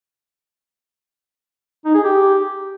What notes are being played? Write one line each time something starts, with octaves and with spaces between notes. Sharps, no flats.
D#4
G#4
G4